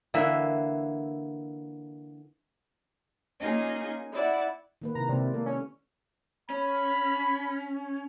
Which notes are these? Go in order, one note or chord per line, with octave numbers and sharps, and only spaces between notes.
D3 E3 A#3 E5
A#3 C#4 D#4 F4 G#4 D#5
E4 D5 F#5
D#3 A#3 B4
C3 E4 A#5
C3 G#3 A#3 D5
A#3 A4
C#4
C#4 B5